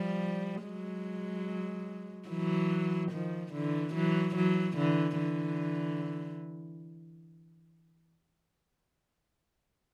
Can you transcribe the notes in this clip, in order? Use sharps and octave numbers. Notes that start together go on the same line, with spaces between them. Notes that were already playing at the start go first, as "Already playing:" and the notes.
Already playing: F3 G3
F#3 G#3
E3 F#3
D#3 F3
D3 E3
E3 F#3
E3 F#3
D3 E3
D3 E3